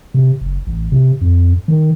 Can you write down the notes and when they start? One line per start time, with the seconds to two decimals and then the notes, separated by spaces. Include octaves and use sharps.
0.14 C3
0.41 F#1
0.67 A1
0.92 C3
1.21 F2
1.68 D#3